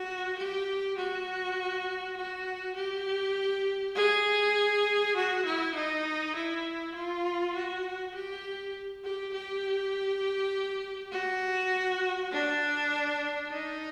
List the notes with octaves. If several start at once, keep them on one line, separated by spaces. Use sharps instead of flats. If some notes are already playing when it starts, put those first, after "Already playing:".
Already playing: F#4
G4
F#4
F#4
G4
G#4
F#4
E4
D#4
E4
F4
F#4
G4
G4
G4
F#4
D4
D#4